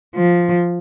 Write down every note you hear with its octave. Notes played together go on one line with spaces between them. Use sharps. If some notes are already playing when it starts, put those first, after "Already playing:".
F3